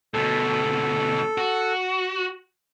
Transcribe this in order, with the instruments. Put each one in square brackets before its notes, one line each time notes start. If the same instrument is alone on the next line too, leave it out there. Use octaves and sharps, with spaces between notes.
[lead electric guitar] D2 B2 [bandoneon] A4
[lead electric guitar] F#4